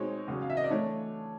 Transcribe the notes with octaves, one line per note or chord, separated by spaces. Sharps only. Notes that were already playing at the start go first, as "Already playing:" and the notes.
Already playing: B2 G#3 C4 D#4 C#5
E2 C#3 F#3
F5
E5
D#5
D5
E3 A3 D4 C#5